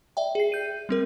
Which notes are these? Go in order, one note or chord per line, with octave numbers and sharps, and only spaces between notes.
D5 E5 G5
G#4 C7
G6 D#7
G3 C4 A#4